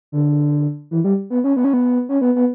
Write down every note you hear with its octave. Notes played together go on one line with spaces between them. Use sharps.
D3
E3
G3
B3
C#4
B3
C#4
B3
C#4
B3
B3